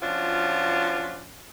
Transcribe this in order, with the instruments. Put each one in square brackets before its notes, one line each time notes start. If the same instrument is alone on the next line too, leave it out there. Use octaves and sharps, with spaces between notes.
[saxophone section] F3 C#4 D4 F4 F#4